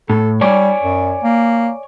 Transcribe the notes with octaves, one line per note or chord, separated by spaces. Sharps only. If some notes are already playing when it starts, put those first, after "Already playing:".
A2 A4
G3 C#5 D5 G#5
F#2
A#3